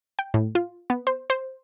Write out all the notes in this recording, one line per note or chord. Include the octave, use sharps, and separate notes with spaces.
G5
A2
F4
B3
C5
C5